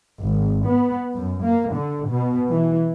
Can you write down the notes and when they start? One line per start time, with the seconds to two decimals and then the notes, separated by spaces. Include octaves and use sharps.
0.21 G#1
0.67 B3
1.14 F#2
1.44 A#3
1.74 D3
2.09 B2
2.50 E3